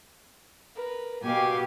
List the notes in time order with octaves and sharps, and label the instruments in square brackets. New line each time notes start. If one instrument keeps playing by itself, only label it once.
[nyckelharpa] A#4 B4
[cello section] B2 G4 [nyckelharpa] F5 G#5